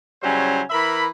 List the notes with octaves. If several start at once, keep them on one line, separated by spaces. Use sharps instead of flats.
C#3 F#3 G3 C#4 E4 C5
E3 A#4 E5 B5